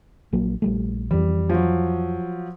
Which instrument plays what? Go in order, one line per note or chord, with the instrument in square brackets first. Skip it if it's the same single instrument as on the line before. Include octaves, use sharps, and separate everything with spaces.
[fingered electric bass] A#1 F#3 A#3
A#1 G3 A3
[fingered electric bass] F2 E3 [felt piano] G3
[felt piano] F3 F#3